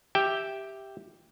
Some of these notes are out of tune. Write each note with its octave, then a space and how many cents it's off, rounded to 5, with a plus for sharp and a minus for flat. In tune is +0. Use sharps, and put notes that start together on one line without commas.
G4 +0 E5 +0 G5 +0